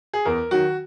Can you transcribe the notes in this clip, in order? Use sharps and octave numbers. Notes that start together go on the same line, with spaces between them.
G#4
E2 A#4
D#3 F#3 F#4